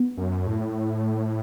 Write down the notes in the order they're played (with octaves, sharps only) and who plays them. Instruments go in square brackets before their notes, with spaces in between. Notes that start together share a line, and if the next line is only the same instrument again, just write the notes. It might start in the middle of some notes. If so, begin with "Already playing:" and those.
Already playing: [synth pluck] B3
[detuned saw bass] F#2
A2